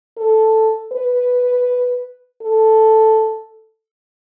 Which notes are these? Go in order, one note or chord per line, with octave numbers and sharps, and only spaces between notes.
A4
B4
A4